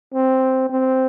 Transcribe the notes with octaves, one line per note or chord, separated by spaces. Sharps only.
C4
C4